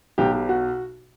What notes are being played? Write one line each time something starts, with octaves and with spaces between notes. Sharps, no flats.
B1 B2 F#3 G4
G4
F#4